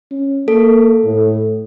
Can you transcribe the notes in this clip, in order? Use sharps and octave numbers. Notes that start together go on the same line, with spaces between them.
C#4
A#3 A4
A2